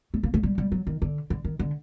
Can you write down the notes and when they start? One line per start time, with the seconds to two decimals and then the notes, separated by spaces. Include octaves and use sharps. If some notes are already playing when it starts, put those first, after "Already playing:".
0.14 A3
0.23 A#3
0.34 A3
0.43 G3
0.58 G3
0.72 F#3
0.87 D#3
1.02 D3
1.30 D3
1.44 D#3
1.59 D3